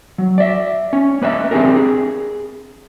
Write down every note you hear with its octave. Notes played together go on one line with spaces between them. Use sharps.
F#3
D5 E5
C#4
A#3 B4 D#5 E5
C4 D4 G4 G#4 A#4
G#4